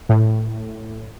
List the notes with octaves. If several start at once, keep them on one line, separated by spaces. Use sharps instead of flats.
A2